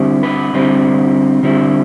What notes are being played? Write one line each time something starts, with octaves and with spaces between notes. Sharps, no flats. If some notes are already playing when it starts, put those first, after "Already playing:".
Already playing: D3 G3 C4 E4
B4
D3 G3 C4 E4
D3 G3 C4 E4